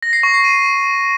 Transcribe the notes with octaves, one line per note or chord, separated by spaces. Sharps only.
A#6
C7
C#6
C7
D#7